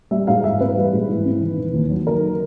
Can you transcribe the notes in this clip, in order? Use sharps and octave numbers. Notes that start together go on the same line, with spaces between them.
G3 E5
G#2 F5
E3 E5
C4 B4
G3
G#2
E3
C4
D#3
E1
D#2
F#3
D#3 A#4